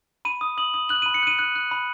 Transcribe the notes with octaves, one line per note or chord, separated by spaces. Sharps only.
B5 D#7
D#6
D#6 F#7
D#6
F#6 F#7
B5 D#7
C#7
F#6 D#7
F#6
F#6
B5